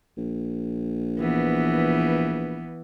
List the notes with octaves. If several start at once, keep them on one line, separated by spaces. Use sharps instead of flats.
A#1
E3 B3